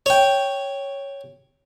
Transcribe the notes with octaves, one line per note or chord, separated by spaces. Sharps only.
C#5 G5